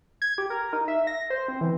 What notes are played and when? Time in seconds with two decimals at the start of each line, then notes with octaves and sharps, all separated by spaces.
0.22 G#6
0.38 G4
0.50 A#4
0.73 D#4
0.88 E5
1.07 A#6
1.30 C5
1.48 C4
1.61 E3